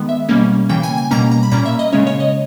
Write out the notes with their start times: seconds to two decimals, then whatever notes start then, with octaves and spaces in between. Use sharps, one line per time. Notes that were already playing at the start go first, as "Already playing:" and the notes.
Already playing: D#3 G#3 B3
0.09 E5
0.29 B2 G3 A#3 C#4
0.69 C#3 E3 A#3 G5
0.83 G#5
0.97 G#5
1.11 B2 G3 A#3 C#4 A#5
1.32 A#5
1.43 B5
1.52 A#2 A#3 C#4 A#5
1.66 E5
1.79 D#5
1.93 C#3 G#3 C#4 C#5
2.07 C#5
2.20 D#5